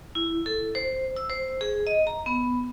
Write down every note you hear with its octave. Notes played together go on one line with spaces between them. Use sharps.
E4
A4
C5
E6
C5
G#4
D#5
A#5
B3